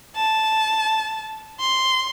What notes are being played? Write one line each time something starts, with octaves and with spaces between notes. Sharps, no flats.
A5
C6